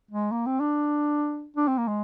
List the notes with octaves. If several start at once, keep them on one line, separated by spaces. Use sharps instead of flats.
G#3
A#3
C4
D4
D4
C4
A#3
G#3